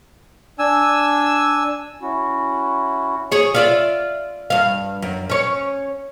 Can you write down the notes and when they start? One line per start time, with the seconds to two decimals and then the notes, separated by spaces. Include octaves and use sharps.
0.59 D4 G#5 E6
2.02 C#4 E4 F#4
3.31 G#4 C#5
3.55 F4 D5 E5
4.50 G2 F5
5.02 F#2
5.30 C#4 C#5